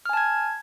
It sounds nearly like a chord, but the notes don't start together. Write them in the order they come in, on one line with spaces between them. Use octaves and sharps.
F6 G#5 A5 G#6